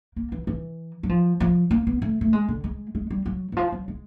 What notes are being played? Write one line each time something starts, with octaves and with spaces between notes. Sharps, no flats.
A#3
E3
E3
F#3
F3
F3
A#3
B3
A3
A3
G#3
D3
G#3
G#3
G3
F#3
E3
F3
F#3
G#3